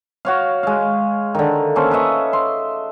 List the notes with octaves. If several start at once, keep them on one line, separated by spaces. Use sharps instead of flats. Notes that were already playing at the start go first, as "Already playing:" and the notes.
F#4 C#5 F5
G#3 F5
D3 D#3
A#3 C#4 A4 C5
B4 D#5 E5 C#6
C6